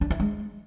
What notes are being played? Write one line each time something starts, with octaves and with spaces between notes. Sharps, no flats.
D4
E4
G#3